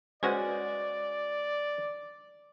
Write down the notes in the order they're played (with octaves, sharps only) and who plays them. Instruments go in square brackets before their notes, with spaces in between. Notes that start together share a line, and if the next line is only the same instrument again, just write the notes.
[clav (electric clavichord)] G#3 C#4 F#4 [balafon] B4 C5 F#5 [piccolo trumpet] D5